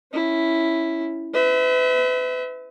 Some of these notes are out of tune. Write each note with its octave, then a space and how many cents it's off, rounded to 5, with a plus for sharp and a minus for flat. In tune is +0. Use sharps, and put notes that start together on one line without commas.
C#4 +0 E4 +0
B4 +35 E5 -30